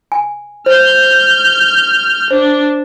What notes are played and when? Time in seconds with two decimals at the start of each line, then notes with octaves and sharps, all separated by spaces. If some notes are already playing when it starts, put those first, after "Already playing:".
0.12 G#5
0.66 C5 F6 G6
2.31 D4 C5